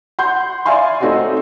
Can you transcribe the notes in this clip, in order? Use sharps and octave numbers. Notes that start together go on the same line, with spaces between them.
F#5 C6 G6
D5 E5 F5 G#5 C6
A3 C4 D#4 F#4 C#5 D5